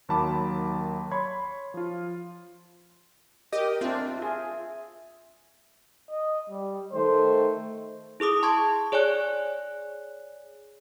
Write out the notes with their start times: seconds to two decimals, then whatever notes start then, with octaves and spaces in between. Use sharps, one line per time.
0.09 D#2 D#3 F#3 A5 B5 D6
1.11 C#5 B5 C6 G#6
1.74 F3 F4
3.52 G4 A#4 D#5
3.81 C4 D4 F4 E5
4.18 F4 G#4 E5
6.11 D#5
6.50 G3
6.93 D#3 A3 C5
8.20 E4 G#4 D6 D#6
8.43 A5 C6 C#6 G#6
8.92 G#4 C#5 D5 G#5 F#6